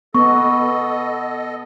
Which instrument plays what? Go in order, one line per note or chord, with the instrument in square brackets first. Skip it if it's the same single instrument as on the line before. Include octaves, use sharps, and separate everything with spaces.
[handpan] B3 [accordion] A4 D#5 [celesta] C#6